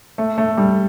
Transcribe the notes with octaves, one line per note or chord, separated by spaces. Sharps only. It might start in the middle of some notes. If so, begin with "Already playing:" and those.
A3
A3
G3